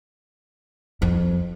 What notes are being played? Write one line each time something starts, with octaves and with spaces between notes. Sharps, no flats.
F2